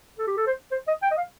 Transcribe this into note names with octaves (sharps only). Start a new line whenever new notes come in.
A4
G4
A4
C5
C5
D#5
G5
D#5
F5